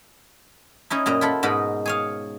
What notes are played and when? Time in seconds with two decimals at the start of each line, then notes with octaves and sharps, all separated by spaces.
0.90 C#4 D#4 E4
1.06 F#2 A#2 D#5 A#5
1.21 E4 F4 A4 F#5 B5
1.43 G#2 B2 D#4 A#4 B5
1.86 G#4 C#5 F5